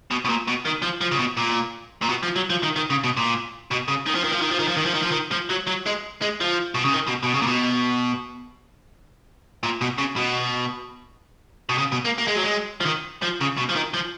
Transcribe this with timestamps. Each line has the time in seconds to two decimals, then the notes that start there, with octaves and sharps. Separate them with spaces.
0.11 B2
0.25 B2
0.29 A#2
0.48 B2
0.66 D#3
0.83 F3
1.01 F3
1.11 C#3
1.18 B2
1.37 A#2
2.02 A#2
2.09 B2
2.23 F3
2.36 F#3
2.50 F3
2.63 D#3
2.76 D#3
2.90 C#3
3.04 B2
3.17 A#2
3.71 B2
3.88 C#3
4.06 D#3
4.15 F3
4.24 D#3
4.32 F3
4.41 D#3
4.51 F3
4.59 D#3
4.68 F3
4.77 D#3
4.86 F3
4.94 D#3
5.03 F3
5.11 D#3
5.32 F3
5.50 F#3
5.67 F#3
5.86 G#3
6.22 G#3
6.40 F3
6.75 B2
6.85 C#3
6.93 D#3
7.08 B2
7.23 B2
7.35 C#3
7.42 A#2
7.47 B2
9.63 A#2
9.81 B2
9.98 C#3
10.16 B2
11.69 B2
11.78 C#3
11.92 B2
12.05 A#3
12.18 A#3
12.27 G#3
12.36 F#3
12.43 G#3
12.80 F3
12.85 D#3
13.22 F3
13.41 C#3
13.57 B2
13.69 F3
13.75 D#3
13.94 F3